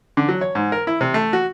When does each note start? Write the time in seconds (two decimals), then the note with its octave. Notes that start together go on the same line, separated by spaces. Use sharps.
0.17 D3
0.29 F#3
0.41 C#5
0.55 G#2
0.72 A#4
0.87 E4
1.01 C3
1.14 A3
1.33 F#4